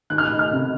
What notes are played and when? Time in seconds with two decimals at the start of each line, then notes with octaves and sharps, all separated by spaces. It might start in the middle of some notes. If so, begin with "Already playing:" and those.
0.10 D#3 F#6
0.18 F6
0.26 F#6
0.39 F6
0.53 C3